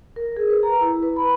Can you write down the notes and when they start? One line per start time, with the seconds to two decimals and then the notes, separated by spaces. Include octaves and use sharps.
0.16 A#4
0.37 G#4
0.50 B4
0.63 A#5
0.81 E4
1.03 B4
1.16 B5